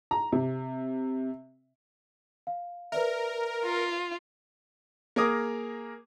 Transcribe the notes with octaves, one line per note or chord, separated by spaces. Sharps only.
A#5
C3
F5
A#4 B4 D5 E5
F4
A#3 G#4 A#4 D6 D#6